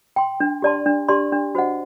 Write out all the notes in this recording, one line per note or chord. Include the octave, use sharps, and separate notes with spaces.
G5 C6
D4
G4 D5 A5 C6
D4
G4 D5 A5 C6
D4
F#4 C5 D#5 F#5